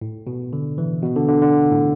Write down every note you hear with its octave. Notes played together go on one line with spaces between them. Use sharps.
A2
B2
D3
E3
B2
D3
D3
D3
A2